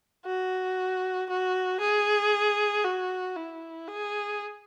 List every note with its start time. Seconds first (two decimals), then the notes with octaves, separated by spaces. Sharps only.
0.26 F#4
1.29 F#4
1.80 G#4
2.84 F#4
3.36 E4
3.88 G#4